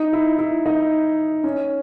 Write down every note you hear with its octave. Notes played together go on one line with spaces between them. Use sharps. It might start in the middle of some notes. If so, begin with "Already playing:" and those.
Already playing: D#4
E4
E4
D#4
C#4